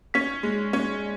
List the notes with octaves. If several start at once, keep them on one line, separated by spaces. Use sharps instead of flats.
C#4 B6
G#3
C#4